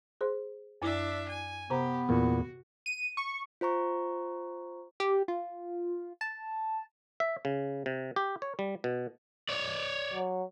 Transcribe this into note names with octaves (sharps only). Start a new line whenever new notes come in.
G#4 C5 C6
F#2 D4 E4 E5
G#5
C3 B3 G4 C5 A#5
E2 A#2 F#4
D#7
C#6
F4 C5 A#5 C#6
G4
F4
A5
E5
C#3
C3
G4
C#5
G3
B2
C#5 D5
F#3